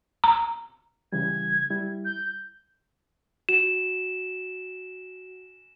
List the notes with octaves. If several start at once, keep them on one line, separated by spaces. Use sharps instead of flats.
A#5
C#3 E3 G3 G#6
G3 E4
G6
F#4 E7